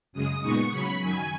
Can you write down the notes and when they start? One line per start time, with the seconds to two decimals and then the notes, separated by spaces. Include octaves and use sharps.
0.13 F#2 C#3 G#3 D#6
0.42 A#2 G#3 B3 D#4 C#6
0.71 C#3 F#3 C#4 B5
0.99 F#2 D#3 F#3 G#5